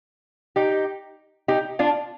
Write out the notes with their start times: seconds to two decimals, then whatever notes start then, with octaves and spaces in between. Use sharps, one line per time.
0.56 D#4 G4
1.48 D#4 G4
1.79 D4 F4